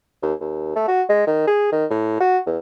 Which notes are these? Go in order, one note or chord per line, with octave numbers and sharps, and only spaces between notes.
D#2
D#2
A3
F#4
G#3
D#3
G#4
D#3
A2
F#4
E2